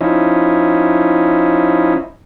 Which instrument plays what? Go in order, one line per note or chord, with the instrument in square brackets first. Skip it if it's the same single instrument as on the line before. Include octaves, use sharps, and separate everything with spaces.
[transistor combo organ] F3 C#4 D#4 E4